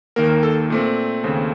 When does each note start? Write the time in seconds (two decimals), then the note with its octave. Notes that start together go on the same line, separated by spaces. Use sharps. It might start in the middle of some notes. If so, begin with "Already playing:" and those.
0.16 D#2 D#3 A#3 A#4
0.30 A#4
0.43 A4
0.70 A#2 A3 C4
1.24 D#2 C#3 A3 C4